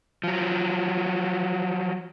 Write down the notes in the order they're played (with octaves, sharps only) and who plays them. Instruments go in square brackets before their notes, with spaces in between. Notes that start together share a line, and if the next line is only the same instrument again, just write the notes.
[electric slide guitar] F3 F#3